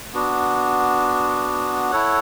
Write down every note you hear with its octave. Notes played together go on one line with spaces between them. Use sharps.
B3 D4 F#4
E4 A4 C#5 F#5